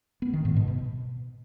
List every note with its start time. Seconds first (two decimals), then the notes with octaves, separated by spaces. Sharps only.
0.22 B3
0.33 D#3
0.45 G#2
0.56 B2
0.68 B2